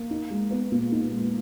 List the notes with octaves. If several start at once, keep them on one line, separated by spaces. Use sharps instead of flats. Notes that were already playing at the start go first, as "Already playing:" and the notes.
Already playing: A#3
D#4
G#3
B3
A#2
D#4
G#3